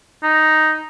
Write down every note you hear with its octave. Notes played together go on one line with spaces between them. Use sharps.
D#4